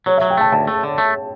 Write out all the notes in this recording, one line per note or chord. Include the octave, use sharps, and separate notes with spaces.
F#3 C#5
F#3 E5
G5
A3 A5
D2 A5
A3
D3
A3